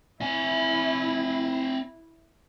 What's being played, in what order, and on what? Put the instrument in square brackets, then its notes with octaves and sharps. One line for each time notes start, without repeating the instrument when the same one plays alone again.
[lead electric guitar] C4 G#5 [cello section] E4